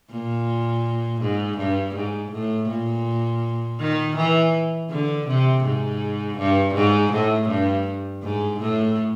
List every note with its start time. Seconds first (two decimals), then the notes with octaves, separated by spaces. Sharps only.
0.10 A#2
1.22 G#2
1.58 G2
1.95 G#2
2.32 A2
2.69 A#2
3.80 D#3
4.16 E3
4.90 D3
5.27 C3
5.64 G#2
6.38 G2
6.75 G#2
7.12 A2
7.49 G2
8.23 G#2
8.60 A2